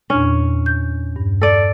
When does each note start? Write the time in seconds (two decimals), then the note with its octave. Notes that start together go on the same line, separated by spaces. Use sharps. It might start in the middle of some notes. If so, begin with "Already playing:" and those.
0.10 E2 A#2 C#4 D4
0.66 G6
1.16 G2
1.41 A4 D5